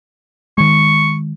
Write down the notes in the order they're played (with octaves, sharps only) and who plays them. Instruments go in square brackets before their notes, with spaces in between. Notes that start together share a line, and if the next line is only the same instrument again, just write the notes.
[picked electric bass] D#3 G#3 [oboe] C#6